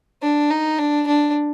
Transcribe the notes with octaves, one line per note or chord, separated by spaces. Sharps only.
D4
D#4
D4
D4